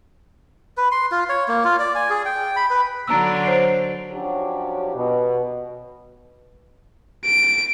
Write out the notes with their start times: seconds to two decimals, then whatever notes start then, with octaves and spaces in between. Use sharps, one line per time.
0.77 B4
0.92 C6
1.11 F4
1.29 C#5
1.48 A#3
1.64 F4
1.79 D5
1.95 G#5
2.10 G#4
2.25 G5
2.56 B5
2.70 B4
3.08 D3 F#3 D4 A#5 E6
3.46 C5 C#5 C7
4.11 F3 F#3 C#4 D4 F#4 G4
4.94 B2
7.25 D7